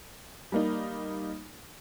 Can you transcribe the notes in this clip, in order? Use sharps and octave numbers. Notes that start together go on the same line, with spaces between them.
G3 A#3 D#4